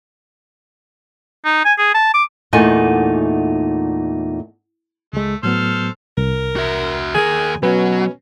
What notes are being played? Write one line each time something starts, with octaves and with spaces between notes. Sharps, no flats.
D#4
G#5
G#4
A5
D6
E2 A#2 A3 D#4 F#5 G#5
C#2 G#3 A3
A2 F#3 B3 A4 C5 F6
C2 A#4
F#4 E5
D#2 G#4 A#4
B2 F#3 C#4 B4